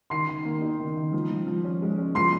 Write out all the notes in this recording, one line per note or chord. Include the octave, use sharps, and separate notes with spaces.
D#3 C6 C7
D#3
A#3
D#4
D#3
D#3
F3
F3
F3
C#4
G#3
C#4
F3 C6 C7